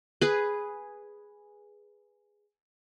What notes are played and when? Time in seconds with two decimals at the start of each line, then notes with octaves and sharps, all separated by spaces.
0.21 G#4 B4